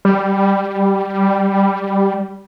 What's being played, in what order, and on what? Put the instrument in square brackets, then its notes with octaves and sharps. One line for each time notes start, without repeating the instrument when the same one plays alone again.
[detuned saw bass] G3